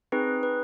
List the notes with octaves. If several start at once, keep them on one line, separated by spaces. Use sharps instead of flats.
C4 D#4 G#4 B4
B4